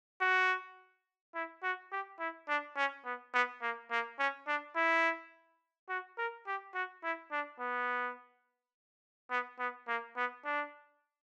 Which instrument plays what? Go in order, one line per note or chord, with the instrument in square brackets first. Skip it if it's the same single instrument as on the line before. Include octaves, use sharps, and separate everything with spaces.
[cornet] F#4
E4
F#4
G4
E4
D4
C#4
B3
B3
A#3
A#3
C#4
D4
E4
F#4
A#4
G4
F#4
E4
D4
B3
B3
B3
A#3
B3
D4